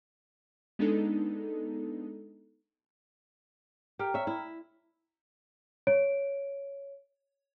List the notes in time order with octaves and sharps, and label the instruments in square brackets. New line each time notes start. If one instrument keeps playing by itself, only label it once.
[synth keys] G#3 B3 D4 D#4 A4
[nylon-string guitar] G4 A#4 [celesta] G5 A#5 F6
[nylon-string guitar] C#5 E5
E4
[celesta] C#5 D7